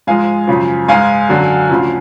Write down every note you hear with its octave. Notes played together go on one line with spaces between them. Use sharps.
G#2 F3 G#3 F5 G#5
F#2 C#3 F3
G#2 G#3 F5 G#5
F#2 D3 F#3
D2 C#3 F3